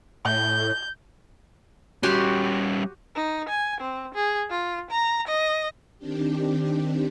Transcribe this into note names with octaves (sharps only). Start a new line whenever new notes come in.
A2 G6
G3 C#4 F#4 G4 C6
D#4
G#5
C4
G#4
F4
A#5
D#5
D#3 C4 D4 G4